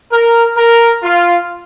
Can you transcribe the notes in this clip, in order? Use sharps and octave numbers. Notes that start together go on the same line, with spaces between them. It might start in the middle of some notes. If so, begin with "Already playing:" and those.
A#4
A#4
F4